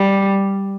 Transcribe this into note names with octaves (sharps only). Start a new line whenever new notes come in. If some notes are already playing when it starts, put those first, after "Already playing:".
Already playing: G3